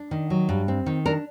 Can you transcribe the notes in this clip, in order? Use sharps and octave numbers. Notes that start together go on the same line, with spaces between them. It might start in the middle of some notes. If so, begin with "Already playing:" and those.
Already playing: D4
D#3
F#3
G2
C4
D#3
D4 A#4